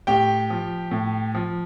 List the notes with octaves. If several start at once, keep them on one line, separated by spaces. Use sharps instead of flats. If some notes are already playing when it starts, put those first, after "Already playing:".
A2 G4 G5
F3
A2
F3